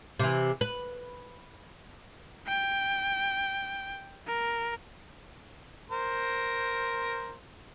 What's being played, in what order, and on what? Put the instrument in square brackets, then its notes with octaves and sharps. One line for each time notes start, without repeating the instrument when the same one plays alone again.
[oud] C3 E3
B4
[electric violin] G5
A#4
[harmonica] A#4 C5